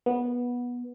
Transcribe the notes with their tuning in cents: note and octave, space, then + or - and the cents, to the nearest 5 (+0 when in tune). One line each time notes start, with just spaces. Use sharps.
B3 -15